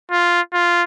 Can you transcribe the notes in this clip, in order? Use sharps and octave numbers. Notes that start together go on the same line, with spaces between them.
F4
F4